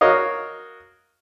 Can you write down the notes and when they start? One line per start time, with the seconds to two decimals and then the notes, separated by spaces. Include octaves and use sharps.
0.01 F#4 A#4 C#5 D#5 F5